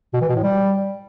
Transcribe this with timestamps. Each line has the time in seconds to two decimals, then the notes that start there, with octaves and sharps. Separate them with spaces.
0.14 B2
0.21 E3
0.28 B2
0.36 A2
0.43 G3